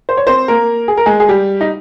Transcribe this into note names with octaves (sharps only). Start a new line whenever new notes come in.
C5
C#5
C4 C5
A#3 A#4
G#4
A#4
G#3 G#4
G#4
G3 G4
D#4